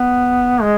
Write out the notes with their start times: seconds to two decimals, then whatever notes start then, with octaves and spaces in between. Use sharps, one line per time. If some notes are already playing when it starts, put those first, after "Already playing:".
Already playing: B3
0.62 G#3